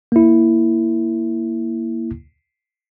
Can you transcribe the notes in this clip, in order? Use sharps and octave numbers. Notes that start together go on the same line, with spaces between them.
A#3 E4